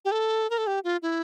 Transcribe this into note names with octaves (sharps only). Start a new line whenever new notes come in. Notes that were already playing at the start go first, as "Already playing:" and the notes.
G4
A4
A#4
A4
G4
F4
E4